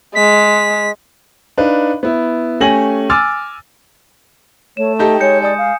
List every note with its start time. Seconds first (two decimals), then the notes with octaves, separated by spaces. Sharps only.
0.15 G#3 B6
1.58 D4 D#4 B4 F5
2.03 B3 E4
2.60 A3 C#4 G4 G#5 A#6 F#7
3.10 G#5 D6 E6 F6 A6
4.77 A3 C#5 E7
4.99 D#4 G4 A4 G5
5.20 G#3 C#5 G6 C#7
5.42 D5 G#5 D#6
5.58 F5